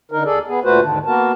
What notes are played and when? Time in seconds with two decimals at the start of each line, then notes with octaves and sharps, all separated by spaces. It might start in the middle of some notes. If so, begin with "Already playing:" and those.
0.12 D3 D#4 A#4
0.24 D#2 G#4 A4 D5
0.48 B3 G#4
0.64 D2 A#2 A3 F#4 B4 C5
0.82 D#2 G#2 D3 D#3 D4
1.06 A#3 B3 F#4 A#4 A5